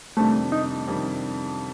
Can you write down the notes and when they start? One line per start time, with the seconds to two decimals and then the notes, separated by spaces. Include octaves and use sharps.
0.17 F2 C3 D#3 G3 A3 D4
0.52 D#4
0.88 F2 C3 D#3 G3 D4